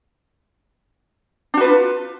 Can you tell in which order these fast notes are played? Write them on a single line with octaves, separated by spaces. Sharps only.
D4 F#4 B4 F4